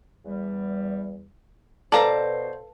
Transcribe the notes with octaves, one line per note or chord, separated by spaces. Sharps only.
E2 G3
B2 A4 B4 C5 D5 F5 A5 A#5